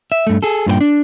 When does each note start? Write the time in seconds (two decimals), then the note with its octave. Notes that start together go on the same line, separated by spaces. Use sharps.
0.12 E5
0.27 G2 A3
0.43 G#4 A4
0.66 G2 A#2 B4 G5
0.81 D4